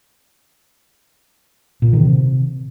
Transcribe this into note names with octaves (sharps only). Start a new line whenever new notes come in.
A#2
D#3
C3